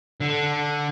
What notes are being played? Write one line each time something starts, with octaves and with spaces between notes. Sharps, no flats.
D3